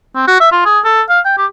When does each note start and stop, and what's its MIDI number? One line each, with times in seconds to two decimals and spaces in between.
0.15 0.24 60
0.28 0.36 66
0.40 0.50 76
0.52 0.62 65
0.66 0.80 68
0.85 1.02 69
1.09 1.20 77
1.25 1.34 79
1.38 1.46 67